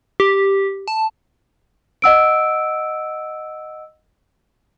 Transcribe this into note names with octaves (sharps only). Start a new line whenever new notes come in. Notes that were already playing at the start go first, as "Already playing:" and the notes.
G4
A5
D#5 F#5 E6 D7